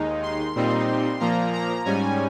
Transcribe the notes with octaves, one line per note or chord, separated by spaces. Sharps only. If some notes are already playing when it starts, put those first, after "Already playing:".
Already playing: D#2 D#3 G#3 D#4
C6
A#2 G3 C4 D#4
A#2 F3 A#3 A#5
A#5
G#2 G3 C#4 G#5